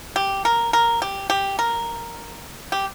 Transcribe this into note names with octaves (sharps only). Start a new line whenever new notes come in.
G4
A#4
A#4
G4
G4
A#4
G4